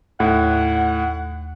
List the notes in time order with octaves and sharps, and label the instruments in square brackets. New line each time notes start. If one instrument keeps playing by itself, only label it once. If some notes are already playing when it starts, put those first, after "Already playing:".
[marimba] D#2 [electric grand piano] A2 [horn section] F#5